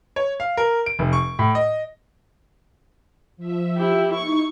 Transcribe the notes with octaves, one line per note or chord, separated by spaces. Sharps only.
C#5
F5
A#4
D7
F1
C#6
A2
D#5
F3 E5
E4 G4
D#4 E4 C#6